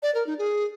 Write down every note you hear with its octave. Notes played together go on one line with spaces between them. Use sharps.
D5
A#4
D#4
G#4